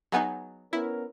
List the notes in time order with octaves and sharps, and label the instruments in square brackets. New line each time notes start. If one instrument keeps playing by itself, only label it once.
[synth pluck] F#3 B3 D#4 [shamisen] G#4 F#5 G#5
[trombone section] B3 C#4 A#4 [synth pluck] E4